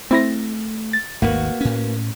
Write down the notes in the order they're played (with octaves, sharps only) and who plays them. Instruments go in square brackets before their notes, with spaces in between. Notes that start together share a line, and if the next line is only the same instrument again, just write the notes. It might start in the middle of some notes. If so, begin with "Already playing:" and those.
[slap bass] A3 [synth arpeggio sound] C4 E4 A#6
[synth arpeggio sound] A6
[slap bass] G#1 D#2 [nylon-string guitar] A#3 B3 F#4
[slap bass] A2 C#4